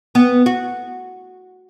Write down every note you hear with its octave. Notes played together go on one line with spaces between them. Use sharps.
B3
F#4